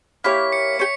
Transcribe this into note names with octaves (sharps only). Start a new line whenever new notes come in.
A#3 E4 G4 C#5 B6
C#7
G4 C#5 C#7